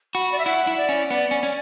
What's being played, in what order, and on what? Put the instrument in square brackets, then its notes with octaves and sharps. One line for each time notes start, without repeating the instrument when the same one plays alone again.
[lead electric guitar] F#4 [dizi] B5
[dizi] D5
E5
[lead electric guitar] E4 [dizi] F#5
[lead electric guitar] E4
[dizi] D5
[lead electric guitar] C#4
[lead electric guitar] B3 [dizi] D5
[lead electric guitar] C#4
[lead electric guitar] C#4 [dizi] D5